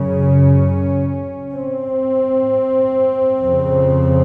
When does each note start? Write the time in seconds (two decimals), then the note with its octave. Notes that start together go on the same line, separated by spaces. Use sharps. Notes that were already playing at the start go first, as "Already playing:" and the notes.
Already playing: F#2 C#3 C#4
1.55 C4
3.42 F2 C#3